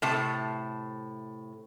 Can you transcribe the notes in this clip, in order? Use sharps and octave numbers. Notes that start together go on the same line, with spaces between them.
A2 C3 A5